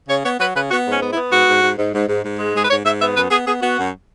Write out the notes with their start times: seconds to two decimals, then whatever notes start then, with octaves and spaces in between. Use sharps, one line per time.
0.09 C#3 C#5
0.24 B3 C#5
0.40 F#3 B4
0.55 C#3 B4
0.70 B3 F#4
0.86 G#2
0.91 C#4
1.01 B3
1.11 E4
1.16 B3
1.31 G#2 F#4
1.47 G#2
1.62 G#2
1.78 G#2
1.93 G#2
2.08 G#2
2.24 G#2
2.39 G#3
2.55 G#2 G#4
2.64 B4
2.69 G#2 C#5
2.85 G#2 E5
3.00 B3 E5
3.16 F#2 B4
3.31 B3 G#4
3.47 B3 G#4
3.62 B3 F#4
3.78 F#2